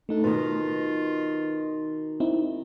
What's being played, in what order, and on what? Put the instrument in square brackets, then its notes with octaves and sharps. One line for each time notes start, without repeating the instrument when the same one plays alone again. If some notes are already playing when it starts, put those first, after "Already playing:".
[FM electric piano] A3 D#4 A4 [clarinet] D4
[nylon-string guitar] B2 D#3 [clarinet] F4 [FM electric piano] B4
[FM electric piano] C4 D#4 E4